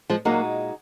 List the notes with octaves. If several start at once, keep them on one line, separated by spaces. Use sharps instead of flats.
F3 G#3
A#2 F#3 G#3 A#3 D#4 F#4